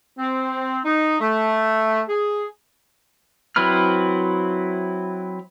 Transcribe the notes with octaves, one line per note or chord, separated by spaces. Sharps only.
C4
D#4
A3
G#4
F#3 C4 E4 B4 F6